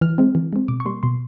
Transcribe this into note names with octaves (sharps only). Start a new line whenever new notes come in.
E3 F6
G#3 C4
E3
G#3 C4
B2 D6
C#6
G3 A#3 C6
B2 C6